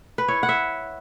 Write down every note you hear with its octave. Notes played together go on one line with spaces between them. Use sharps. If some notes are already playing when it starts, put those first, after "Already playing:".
B4
E4 C#5
F#5
E5